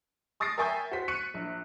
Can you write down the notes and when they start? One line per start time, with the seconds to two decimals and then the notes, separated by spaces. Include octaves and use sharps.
0.40 C#6 D#6 A6 A#6 C7 D7
0.58 A#4 E5 G5 G#5 C#6 G6
0.91 F#4 C5 B6
1.08 C#6 F#6 C#7 D#7
1.34 A#1